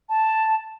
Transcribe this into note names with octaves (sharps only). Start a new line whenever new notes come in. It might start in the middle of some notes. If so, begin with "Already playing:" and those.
A5